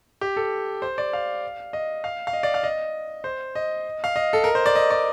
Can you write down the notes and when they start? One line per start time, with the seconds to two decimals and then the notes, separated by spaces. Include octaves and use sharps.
0.21 G4
0.37 A4
0.82 C5
0.98 D5
1.13 F5
1.73 D#5
2.04 F5
2.27 F5
2.33 D#5
2.43 D5
2.54 F5
2.63 D#5
3.24 C5
3.55 D#5
4.04 F5
4.16 D#5
4.33 A4
4.44 A#4
4.55 C5
4.66 D5
4.75 D#5
4.90 D5